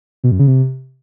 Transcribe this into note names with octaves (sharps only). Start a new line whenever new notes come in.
B2
F#2
C#3
C3